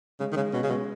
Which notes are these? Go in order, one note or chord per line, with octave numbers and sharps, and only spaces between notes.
C#3 G#3
D#3
C#3 G#3
B2 C#4
C#3
B2 G#3